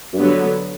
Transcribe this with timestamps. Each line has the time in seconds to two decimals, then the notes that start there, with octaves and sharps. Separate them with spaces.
0.13 F#2
0.17 G2 D3 F#3 B3